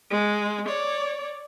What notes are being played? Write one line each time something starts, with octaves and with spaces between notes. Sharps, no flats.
G#3
C#5 D5